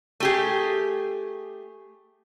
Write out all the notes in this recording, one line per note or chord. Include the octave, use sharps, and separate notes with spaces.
A3 G4 G#4